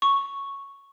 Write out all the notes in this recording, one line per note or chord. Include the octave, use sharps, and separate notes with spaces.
C#6